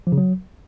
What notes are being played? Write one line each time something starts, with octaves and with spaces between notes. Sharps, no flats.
F3
C#3
F#3